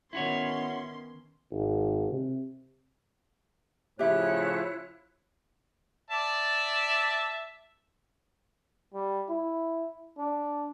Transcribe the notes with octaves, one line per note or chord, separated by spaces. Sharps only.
D#3 B3 C#4 E4 F#4 C#5 C6
G#1
C3
A2 C#3 F3 E4 G4 C#5 E5 F#6
D5 E5 A5
G3
E4
D4